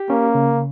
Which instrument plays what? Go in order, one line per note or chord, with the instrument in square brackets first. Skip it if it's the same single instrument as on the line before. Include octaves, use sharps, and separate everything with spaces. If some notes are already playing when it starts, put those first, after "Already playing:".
Already playing: [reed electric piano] G4
[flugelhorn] A#3 [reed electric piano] C#4
[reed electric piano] C#3